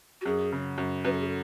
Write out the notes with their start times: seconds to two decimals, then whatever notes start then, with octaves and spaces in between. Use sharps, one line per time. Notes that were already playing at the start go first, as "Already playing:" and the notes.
0.21 F#4
0.25 F#2 G#4
0.52 C#3
0.78 F#2
1.04 F#2 B4
1.11 A4
1.19 G#4
1.26 A4